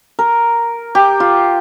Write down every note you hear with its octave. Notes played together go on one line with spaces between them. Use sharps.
A#4
G4
F4